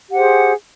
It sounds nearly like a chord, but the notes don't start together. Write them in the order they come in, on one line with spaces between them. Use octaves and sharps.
G4 F#5 C5 G#4